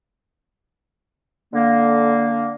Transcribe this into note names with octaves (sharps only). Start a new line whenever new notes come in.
D3 A#3